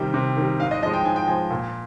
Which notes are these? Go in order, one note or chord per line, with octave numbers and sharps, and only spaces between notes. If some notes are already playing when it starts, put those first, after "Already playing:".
Already playing: C3 D#3 G3 G5
C3
D#3 G3
G#2 F5
D#5
F3 G#3 D#5
G5
G#2 G#5
G5
F3 G#3 G#5
A#2